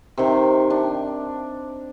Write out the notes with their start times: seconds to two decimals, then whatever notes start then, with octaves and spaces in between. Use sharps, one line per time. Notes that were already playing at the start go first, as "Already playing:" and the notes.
0.18 C3 D#3
0.70 D4